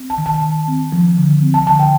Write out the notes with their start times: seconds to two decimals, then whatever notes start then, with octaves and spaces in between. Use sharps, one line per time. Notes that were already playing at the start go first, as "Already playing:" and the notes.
Already playing: C4
0.10 A5
0.18 D#3
0.26 A5
0.42 D#3
0.68 C4
0.92 F3
1.17 D3
1.42 C4
1.54 A5
1.66 D3 A5
1.79 G5